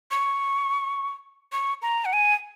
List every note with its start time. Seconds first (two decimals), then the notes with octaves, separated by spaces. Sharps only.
0.11 C#6
1.52 C#6
1.82 A#5
2.05 F#5
2.13 G#5